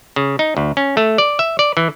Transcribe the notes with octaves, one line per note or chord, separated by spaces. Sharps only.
C#3
D#4
D2
C#4
A3
D5
E5
D5
E3